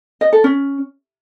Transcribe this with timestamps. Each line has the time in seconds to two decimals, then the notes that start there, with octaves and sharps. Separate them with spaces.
0.21 D#5
0.33 A4
0.44 C#4